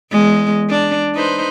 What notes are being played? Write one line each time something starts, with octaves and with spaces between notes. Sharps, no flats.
E2 G#3
D4
D#4 B4 C5